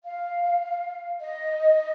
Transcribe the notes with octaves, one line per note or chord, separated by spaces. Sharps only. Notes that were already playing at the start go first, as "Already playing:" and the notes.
F5
D#5